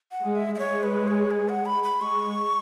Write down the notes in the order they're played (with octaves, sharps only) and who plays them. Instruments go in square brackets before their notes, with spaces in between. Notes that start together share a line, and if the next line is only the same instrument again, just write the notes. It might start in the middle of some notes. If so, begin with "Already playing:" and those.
[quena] F#5
[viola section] G#3
[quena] E5
E5
[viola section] G#3 [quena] C#5
[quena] B4
C#5
G#4
F#5
B5
B5
[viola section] G#3 [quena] C#6